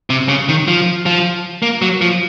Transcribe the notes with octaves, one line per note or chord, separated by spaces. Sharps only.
C3
C#3
D#3
F3
F3
A#3
F#3
F3